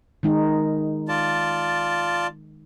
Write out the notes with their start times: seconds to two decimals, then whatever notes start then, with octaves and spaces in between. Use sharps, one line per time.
0.23 D#3 G#3 D#4
1.08 F4 D5 A5